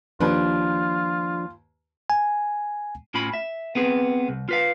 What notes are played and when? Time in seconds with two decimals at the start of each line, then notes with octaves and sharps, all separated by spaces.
0.20 D#2 F3 D4 F4 B4
2.10 G#5
3.14 A2 C#4 F4 G#5 B5
3.34 E5
3.75 B3 C4 G#4 B4
4.29 C2
4.49 F4 B4 F5